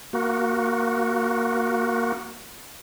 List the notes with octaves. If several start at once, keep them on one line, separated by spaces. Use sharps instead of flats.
A#3 F#4